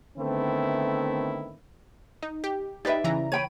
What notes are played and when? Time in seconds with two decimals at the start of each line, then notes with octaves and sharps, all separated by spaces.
0.18 D3 D#3 A3 B3 C4 E4
2.23 D#4
2.44 G4
2.85 D#4 G4 B4 D5 E5
3.04 C#3 E3 A#5
3.32 C#5 G5 B5 D#7